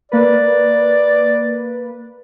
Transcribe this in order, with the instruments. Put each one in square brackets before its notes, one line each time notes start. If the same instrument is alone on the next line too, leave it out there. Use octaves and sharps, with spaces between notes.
[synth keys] A#3 B4 [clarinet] D5